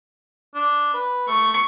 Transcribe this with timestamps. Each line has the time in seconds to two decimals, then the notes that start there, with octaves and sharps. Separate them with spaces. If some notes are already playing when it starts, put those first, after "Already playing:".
0.55 D4
0.94 B4
1.28 A3 C#6